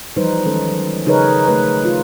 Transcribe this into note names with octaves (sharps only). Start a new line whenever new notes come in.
E3 F3 G3 D#4 B4 C5
D#3 G3 G#3 C#4 A4
F#3
C#3 D#4 G#4 A#4 B4 C#5
A3 B4
F4